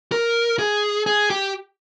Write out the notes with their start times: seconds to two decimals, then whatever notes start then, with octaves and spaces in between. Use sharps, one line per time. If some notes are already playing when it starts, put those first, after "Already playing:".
0.12 A#4
0.59 G#4
1.06 G#4
1.30 G4